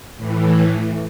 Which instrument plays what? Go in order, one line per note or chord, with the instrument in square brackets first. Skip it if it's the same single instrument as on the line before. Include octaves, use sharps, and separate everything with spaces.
[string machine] A2 E3